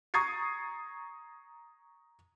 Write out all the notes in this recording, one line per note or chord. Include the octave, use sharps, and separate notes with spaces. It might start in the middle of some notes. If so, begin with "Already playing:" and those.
A#5 C#6 D#6 G#6 A6 C7